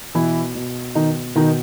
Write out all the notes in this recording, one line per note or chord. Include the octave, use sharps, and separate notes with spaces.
B2 E3 E4
B2
B2 D#3 D#4
B2 D#3 D#4